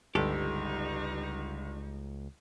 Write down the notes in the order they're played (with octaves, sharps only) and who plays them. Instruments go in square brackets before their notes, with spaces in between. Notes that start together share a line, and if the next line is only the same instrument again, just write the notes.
[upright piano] G1 [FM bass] C#2 [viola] G3 D#4 [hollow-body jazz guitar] G4 A4